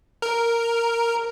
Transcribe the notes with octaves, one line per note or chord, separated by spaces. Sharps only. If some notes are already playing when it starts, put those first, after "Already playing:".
A#4